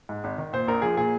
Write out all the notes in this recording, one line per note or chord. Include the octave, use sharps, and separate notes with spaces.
G#2
G#1
D#3
A#2 C5
A#1 A#4
F3 G#4
A#2 G#4